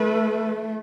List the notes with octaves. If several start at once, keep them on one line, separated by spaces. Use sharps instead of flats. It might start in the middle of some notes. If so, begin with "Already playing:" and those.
Already playing: A3 B4